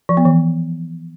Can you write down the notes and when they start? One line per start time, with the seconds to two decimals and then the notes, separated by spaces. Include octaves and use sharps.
0.09 F3
0.17 B3
0.25 E3